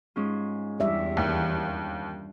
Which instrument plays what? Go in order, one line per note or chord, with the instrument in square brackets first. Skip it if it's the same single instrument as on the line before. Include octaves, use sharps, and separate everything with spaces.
[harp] G#2 C#4 F4
[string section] E2 [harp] G2 [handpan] D5 E5
[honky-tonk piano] D#2